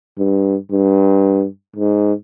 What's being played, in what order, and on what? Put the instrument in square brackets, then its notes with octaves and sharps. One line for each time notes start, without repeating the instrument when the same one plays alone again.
[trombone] G2
G2
G#2